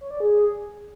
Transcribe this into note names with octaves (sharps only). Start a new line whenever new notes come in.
C#5
D5
G#4